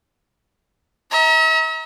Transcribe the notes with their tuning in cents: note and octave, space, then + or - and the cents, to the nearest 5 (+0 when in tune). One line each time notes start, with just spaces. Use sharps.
E5 -45 A#5 +0